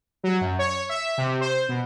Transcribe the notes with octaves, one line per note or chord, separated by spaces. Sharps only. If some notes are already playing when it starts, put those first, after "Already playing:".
F#3
F#2
C#5
E5
C3
C5
B2